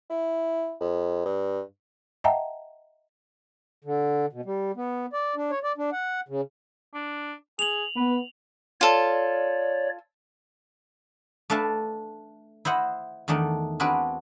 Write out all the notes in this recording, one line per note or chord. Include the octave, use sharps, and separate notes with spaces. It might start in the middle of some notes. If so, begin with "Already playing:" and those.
E4
F2
G2
D#5 E5 F#5 G5 A5 A#5
D3
B2
G3
B3
D5
D4
C#5
D5
D4
F#5
C#3
D4
G#4 F7 F#7
B3 B4
F4 A4 C#5 D5
A3 D4 B4 E5 F5 A5
E4 C5 D#5 F#5
E2 D#3 A3 D4 D#4
C4 D4 F#4 G#4 A#4 B4